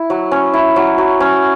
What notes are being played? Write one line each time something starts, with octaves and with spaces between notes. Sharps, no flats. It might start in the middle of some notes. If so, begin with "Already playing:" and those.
Already playing: E4
F#3
C#4
E4
F#3
F#3
C#4